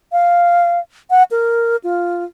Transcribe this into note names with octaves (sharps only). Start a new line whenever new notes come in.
F5
F#5
A#4
F4